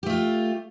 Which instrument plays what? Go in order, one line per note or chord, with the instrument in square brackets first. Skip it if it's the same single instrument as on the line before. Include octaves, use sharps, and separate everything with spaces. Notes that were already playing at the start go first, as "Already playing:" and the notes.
[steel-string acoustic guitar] G4
A3
F4